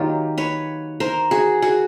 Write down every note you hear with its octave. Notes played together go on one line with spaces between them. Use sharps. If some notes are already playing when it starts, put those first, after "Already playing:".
Already playing: D#3 F#3 A#3 F4 G4
B4 C#5
A#4 C5
F#4 G#4
F#4 G#4